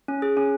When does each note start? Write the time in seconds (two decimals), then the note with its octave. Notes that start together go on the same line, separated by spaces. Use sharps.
0.08 C#4
0.22 G#4
0.37 C#4